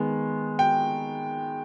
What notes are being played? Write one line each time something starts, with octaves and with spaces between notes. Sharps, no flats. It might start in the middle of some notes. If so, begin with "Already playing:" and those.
Already playing: D#3 G#3 B3
G5